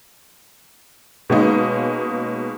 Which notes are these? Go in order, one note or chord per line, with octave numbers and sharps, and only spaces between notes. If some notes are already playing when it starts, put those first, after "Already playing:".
B2 G#3 A#3 C#4 D#4